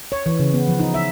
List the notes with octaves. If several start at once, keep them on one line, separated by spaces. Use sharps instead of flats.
C#5
E3
C#3
B3
F3
D#4
E5